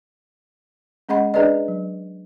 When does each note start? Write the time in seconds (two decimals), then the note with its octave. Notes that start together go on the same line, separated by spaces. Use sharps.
1.09 G#3 C#4 G#4 D#5 F#5 B5
1.34 D4 G#4 B4 D5 D#5
1.68 F#3